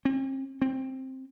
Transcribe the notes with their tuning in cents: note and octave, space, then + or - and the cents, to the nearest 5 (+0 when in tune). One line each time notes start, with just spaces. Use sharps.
C4 +40
C4 +10